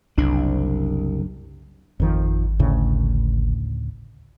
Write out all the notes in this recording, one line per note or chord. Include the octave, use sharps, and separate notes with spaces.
F#1 C2 D4
G#1 F2 D#3 F3
D2 A2 C#3